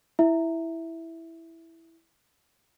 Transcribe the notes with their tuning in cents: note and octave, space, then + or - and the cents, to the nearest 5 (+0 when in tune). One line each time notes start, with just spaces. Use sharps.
E4 +0 E5 +0